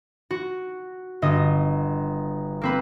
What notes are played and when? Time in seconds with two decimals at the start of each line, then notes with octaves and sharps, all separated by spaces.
0.31 F#4
1.22 G1 D#5
2.62 A#3 C4 B4